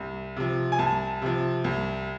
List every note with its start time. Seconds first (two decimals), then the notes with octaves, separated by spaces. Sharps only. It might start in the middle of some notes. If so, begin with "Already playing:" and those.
Already playing: C2
0.37 C3 F3
0.72 G#5
0.79 C2 A5
1.22 C3 F3
1.64 C2